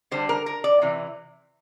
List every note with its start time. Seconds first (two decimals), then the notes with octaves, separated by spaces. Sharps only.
0.11 D3 G3 D4 C5
0.29 A#4
0.46 A#4
0.64 D5
0.82 C3 E3